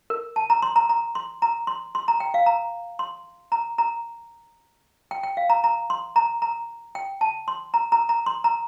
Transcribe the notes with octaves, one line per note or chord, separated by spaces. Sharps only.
A#4
A5
A#5
C6
A#5
A#5
C6
A#5
C6
C6
A#5
G5
F5
A#5
C6
A#5
A#5
G5
G5
F5
A#5
A#5
C6
A#5
A#5
G5
A5
C6
A#5
A#5
A#5
C6
A#5